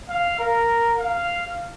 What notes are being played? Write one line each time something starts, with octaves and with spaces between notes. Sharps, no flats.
F5
A#4
F5